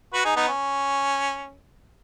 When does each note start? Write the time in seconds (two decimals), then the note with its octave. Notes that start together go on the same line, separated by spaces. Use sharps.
0.13 F#4 B4
0.24 D#4 G#4
0.36 B3 D#4
0.48 C#4